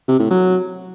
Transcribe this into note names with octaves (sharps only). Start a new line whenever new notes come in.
C3
A2
F#3